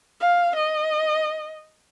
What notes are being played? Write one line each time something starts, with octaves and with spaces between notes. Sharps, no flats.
F5
D#5